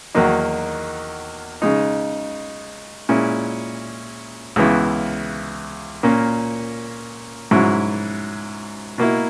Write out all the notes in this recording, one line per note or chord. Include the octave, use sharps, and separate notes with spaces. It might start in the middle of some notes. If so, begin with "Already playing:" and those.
E2 D#3 F#3 A#3 D#4
C#3 G#3 D#4
A#2 G#3 C#4 E4
C#2 C#3 E3 B3 E4
A#2 A#3 C#4
G#2 F#3 C#4 E4
B2 A#3 E4